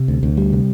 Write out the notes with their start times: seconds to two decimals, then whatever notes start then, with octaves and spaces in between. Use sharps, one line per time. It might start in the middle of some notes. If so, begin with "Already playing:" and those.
Already playing: C3
0.08 D2
0.23 D2
0.37 G3
0.53 C3